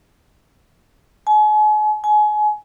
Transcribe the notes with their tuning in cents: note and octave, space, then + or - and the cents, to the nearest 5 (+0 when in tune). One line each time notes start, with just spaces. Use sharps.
G#5 +40
G#5 +30